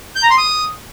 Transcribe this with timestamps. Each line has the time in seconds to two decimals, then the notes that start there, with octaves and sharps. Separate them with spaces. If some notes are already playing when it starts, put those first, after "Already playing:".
0.16 G6
0.23 A#5
0.30 C6
0.38 D#6